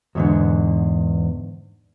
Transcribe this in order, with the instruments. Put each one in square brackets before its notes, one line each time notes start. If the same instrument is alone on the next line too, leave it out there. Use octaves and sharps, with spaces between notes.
[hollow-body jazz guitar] E2 G#2 D3